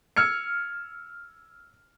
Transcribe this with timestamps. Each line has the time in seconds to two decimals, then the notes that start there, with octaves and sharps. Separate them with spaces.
0.17 E6 F6 G#6 C#7